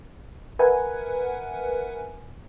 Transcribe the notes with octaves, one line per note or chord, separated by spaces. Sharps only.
A#4 B4 E5 F#5 G#5